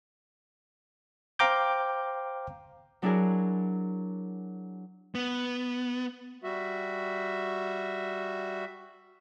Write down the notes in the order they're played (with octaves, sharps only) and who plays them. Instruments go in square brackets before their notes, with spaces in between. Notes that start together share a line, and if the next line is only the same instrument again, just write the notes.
[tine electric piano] C5 F5 G5 A#5 D6 G6
[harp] F#3 D4 E4 F#4 G#4 A#4
[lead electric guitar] B3
[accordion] G3 F#4 E5